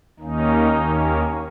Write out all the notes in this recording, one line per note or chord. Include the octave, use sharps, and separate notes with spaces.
D#2 D#3 A#3 C#4 D#4
D#2 D#3 A#3 C#4